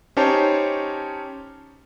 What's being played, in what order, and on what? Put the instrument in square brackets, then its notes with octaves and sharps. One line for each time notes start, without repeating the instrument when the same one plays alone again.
[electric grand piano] C#4 D#4 G4 C5 C#5 A5